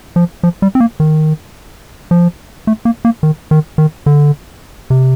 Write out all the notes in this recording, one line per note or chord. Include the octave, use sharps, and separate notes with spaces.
F3
F3
G3
C4
A#3
D#3
F3
A3
A#3
A#3
D#3
D#3
D#3
D3
C3